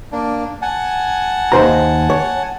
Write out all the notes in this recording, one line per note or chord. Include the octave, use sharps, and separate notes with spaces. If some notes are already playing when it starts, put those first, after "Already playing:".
A#3 D4
F#5 G#5 A5
D#2 C5 A#5
C#5